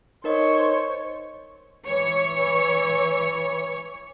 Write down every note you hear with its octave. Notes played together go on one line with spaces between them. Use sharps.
D#4 A#4 C5 C#5 D#5
E3 C#5